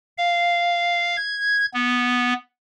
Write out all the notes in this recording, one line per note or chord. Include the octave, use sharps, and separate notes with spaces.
F5
G#6
B3